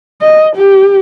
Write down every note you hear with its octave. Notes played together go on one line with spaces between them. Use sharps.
D#5
G4